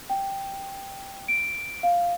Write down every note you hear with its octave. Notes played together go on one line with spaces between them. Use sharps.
G5
D7
F5